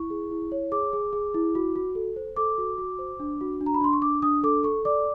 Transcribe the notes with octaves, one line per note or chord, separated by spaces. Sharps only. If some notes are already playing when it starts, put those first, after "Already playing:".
Already playing: E4 C#6
G#4
E4
C#5
G#4 D6
G#4
G#4
E4
F#4
F#4
A4
C5
A4 D6
F#4
F#4
C5
D4
F#4
D4
A#5
B5
D4 C6
C#6
D4 D6
D4 D#6
A4 D6
A4 C#6
D5 D6